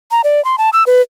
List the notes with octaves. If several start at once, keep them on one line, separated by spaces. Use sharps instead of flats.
A#5
D5
C6
A5
E6
B4